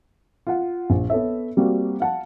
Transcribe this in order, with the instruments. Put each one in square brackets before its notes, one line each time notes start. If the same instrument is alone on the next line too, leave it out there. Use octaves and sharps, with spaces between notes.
[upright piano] F4 F#5
A#1
B3 A4 C#5 E5
G3 A#3 C4 F#4
F5 F#5 A5